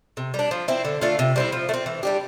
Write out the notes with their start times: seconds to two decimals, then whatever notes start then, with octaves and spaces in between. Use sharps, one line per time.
0.17 C3
0.34 G3
0.39 D4
0.51 F3
0.68 C4 E4
0.85 D3
1.01 A3 D4 F4
1.19 C3
1.36 G3 C4 E4
1.52 F3
1.69 A3
1.74 C4
1.86 E3
2.03 G3 D4 G4